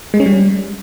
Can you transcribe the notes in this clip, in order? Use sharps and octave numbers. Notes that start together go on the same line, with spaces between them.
G#3
C#4
G3